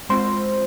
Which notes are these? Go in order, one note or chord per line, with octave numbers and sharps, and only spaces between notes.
G#3 C4 F4 C5